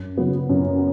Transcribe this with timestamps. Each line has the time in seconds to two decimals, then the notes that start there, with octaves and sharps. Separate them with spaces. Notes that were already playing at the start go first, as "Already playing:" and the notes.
Already playing: F#2
0.17 C#3 F#3 B3
0.49 F#2